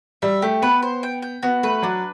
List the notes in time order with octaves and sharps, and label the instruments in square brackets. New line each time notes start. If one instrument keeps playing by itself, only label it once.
[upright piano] G3 [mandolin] E5
[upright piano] A3 [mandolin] G4
[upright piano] B3 [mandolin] B4
[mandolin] C5
G5
G5
[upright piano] B3 [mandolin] F#4
[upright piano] A3 [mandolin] B4
[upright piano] F#3 [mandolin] D4